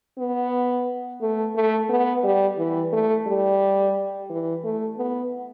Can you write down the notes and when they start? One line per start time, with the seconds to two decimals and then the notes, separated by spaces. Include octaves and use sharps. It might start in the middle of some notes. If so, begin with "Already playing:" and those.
0.19 B3
1.21 A3
1.55 A3
1.89 B3
2.24 G3
2.58 E3
2.92 A3
3.27 G3
4.30 E3
4.64 A3
4.98 B3